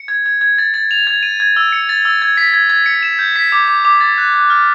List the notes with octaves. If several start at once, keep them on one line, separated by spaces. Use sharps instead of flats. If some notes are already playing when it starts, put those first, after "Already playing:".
Already playing: C#7
G#6
G#6
G#6
A6
A6
F7
G#6
D#7
G#6
E6
C#7
A6
E6
G#6
B6
G#6
G#6
C#7
E7
G6
B6
D6
D6
D6
A6
F#6
F#6
F6